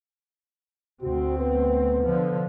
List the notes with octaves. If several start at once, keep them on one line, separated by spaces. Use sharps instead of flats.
D2 C4 F#4
B3
D3 F3